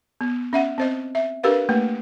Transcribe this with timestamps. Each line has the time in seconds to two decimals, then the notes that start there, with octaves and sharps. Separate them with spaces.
0.21 B3
0.53 C#4 E5 F#5
0.78 C4 C5 D#5
1.15 E5
1.43 D4 G4 A#4 B4 F5
1.69 A3 A#3 B4